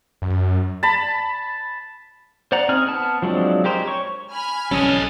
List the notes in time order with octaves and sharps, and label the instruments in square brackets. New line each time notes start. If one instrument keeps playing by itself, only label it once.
[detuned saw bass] F#2
[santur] A5 B5
[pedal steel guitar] C5 D5 F#5 A#5
C4 D#4 G#4 F6
B3 A5 F6
F3 F#3 G#3 C4 D4
G#3 G4 A#4 C5
C#5 C#6
[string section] G#5 B5 F6
[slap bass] B1 E3 G3 [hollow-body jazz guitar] C#4 [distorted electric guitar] A4 D#5